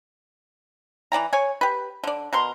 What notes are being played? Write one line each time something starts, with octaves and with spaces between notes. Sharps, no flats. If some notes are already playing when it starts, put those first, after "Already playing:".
E3 D5 G5 A#5
C#5 G#5
G4 B4
D3 D5
B2 A#4 C6